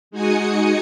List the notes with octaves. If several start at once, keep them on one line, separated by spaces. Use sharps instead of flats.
G#3 D#4 F#4 G#5 D#6 C#7